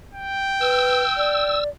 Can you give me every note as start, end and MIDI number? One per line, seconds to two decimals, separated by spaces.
0.14 1.60 79
0.61 1.03 71
0.61 1.64 88
1.17 1.69 74